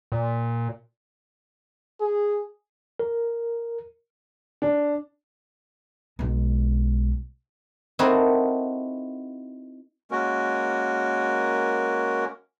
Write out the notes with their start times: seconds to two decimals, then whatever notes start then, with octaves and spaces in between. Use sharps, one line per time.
0.12 A#2
2.01 G#4
3.00 A#4
4.62 D4
6.19 B1 G#3
7.99 C4 D#4 E4 F#4 A4 A#4
10.11 G#3 A#3 C#4 F#4 A#4